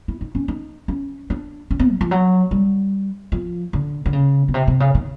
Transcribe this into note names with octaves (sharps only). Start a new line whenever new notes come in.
E4
D#4
C#4
D#4
C#4
D4
C#4
C4
F#3
F3
F#3
G3
F3
D3
D3
C#3
B2
C3
C3
C#3
D#3